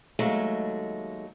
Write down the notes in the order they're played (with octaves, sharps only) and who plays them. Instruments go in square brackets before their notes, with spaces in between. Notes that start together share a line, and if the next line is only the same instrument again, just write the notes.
[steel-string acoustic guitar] D#2 F#3 G#3 A3